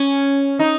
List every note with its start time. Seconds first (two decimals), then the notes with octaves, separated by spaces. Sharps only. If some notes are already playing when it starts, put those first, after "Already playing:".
Already playing: C#4
0.59 D#4